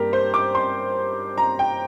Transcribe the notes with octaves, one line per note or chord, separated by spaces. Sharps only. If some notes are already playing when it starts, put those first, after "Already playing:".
Already playing: G2 G3 A#3 G4 A#4
C5
D6
C6
A#5
G5